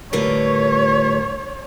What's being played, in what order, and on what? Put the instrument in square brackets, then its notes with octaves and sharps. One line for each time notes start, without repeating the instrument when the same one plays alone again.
[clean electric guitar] A2 D3 G3 [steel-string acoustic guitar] F4 A#4 B4 [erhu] C#5